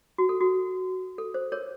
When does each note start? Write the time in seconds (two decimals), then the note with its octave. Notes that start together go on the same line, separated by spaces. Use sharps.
0.18 F#4
0.29 A4
0.41 F#4
1.18 A4
1.34 C5
1.52 A#4 C#5